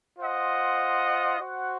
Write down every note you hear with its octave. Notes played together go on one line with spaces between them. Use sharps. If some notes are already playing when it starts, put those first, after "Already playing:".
F4 C5 D#5 F#5
F#4 C5 F#5